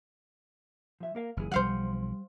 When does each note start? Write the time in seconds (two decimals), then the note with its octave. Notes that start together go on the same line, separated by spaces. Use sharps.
1.00 F3 E5
1.15 A#3 A#4 F5
1.37 F#1 C#2 E3 G#4
1.51 B1 F3 G3 C5 F5 F#5